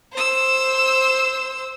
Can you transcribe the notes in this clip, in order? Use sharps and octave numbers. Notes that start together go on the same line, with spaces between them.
C5 E6